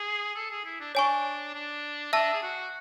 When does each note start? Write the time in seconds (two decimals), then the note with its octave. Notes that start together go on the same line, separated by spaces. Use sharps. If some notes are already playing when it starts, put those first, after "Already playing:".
Already playing: G#4
0.35 A4
0.50 G#4
0.65 E4
0.80 D4
0.95 D4 C#5 G#5 C#6
1.54 D4
2.13 D4 E5 A5 E6
2.33 G#4
2.43 F#4